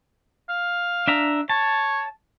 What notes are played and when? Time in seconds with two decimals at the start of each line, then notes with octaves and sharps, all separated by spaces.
0.49 F5
1.08 D4 E5 A#5
1.50 C#5 A5